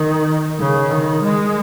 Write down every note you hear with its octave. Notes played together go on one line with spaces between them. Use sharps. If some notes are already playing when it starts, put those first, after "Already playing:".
Already playing: D#3
C#3
D#3
G#3